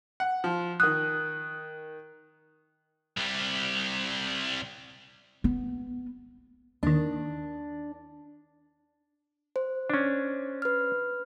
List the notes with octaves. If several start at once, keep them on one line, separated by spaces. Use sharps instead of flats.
F#5
F3
D#3 D#6 F#6
C2 G3
B3
D#2 D#3 D4
C5
C#4 D4
B4 F6